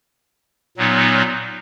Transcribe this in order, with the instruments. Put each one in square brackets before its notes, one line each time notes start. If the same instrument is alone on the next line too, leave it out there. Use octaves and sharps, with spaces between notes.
[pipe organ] A#2 F#3 B3 D#4